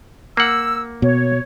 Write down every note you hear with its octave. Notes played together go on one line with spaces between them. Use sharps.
A#3 F#5 E6
B2 C#5